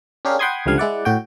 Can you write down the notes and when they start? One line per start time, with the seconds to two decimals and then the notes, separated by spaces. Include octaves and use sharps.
0.25 C#4 D4 G4 G#4 A#4 F5
0.39 F#5 G5 B5 C6 D#6 G#6
0.66 C#2 D3 F3 G3 F5 G#6
0.78 G#3 E4 D5 F#5
1.05 A2 F#4 G5